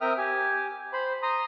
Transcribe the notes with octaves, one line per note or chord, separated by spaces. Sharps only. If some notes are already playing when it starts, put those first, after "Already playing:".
C4 A#4 E5 G5 D#6 F6
G4 G#5
C5 B5
A#5 C6 D#6